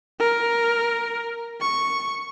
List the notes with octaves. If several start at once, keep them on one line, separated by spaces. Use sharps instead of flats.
A#4
C#6